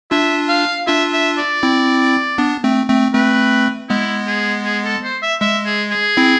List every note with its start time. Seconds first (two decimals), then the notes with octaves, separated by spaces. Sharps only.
0.11 D4 F4 E5
0.49 F5
0.87 D4 F4 E5
1.13 E5
1.38 D5
1.63 C4 E4
2.38 B3 D4
2.64 A3 C4
2.89 A3 C4
3.14 A3 C4 B4
3.89 G#3 B3 E4
4.28 G#4
4.65 G#4
4.85 A4
5.04 C5
5.22 E5
5.41 G#3 E5
5.66 G#4
5.91 G#4
6.17 C4 E4